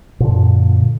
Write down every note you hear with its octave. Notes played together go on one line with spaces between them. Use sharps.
F#2 A#2 D3